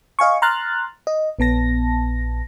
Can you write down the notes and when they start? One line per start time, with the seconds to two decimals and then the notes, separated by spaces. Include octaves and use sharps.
0.19 D#5 F5 G#5 C#6
0.42 A#5 C6 F6 F#6 A6
1.07 D#5
1.39 A#1 B3 A5 A#6